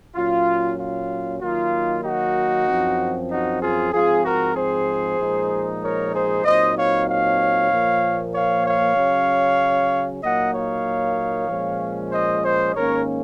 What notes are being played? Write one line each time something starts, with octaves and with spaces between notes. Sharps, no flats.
A#2 F#3 C#4 F4
F4
D#3 F#3 A#3 D#4 F4
D#4 F#4
F#2 F3 C4
D#4 F#4
F4 G#4
G#2 F3 C4 F4 G#4
F#4 A#4
G#4 C5
A#2 F3 G#3 D#4
A#4 C#5
G#4 C5
A#2 F#3 C4 D#4 C5 D#5
C#5 F5
C#5 F5
A#2 F3 A#3
C#5 F5
C#5 F5
C#3 F#3 C#4
A#2 F#3 A#3 D#4 D#5 F#5
C#5 F5
A#2 F3 G#3 C#4
C5 D#5
C5 D#5
G#2 D#3 A#3 C#4 A#4 C#5